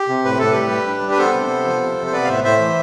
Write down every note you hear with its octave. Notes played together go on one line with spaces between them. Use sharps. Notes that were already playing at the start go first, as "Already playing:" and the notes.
Already playing: G4
C3
A2 B4
A2 A4
G3 G4 B4
G3
D4
G3
B4
B3 A4 C5
C3
B3
F3
C3
C3
C5
B3 B4 D5
F5
A2 C5 E5
A2 C5 E5
E3